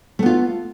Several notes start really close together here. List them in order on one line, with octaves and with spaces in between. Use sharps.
A3 B3 F4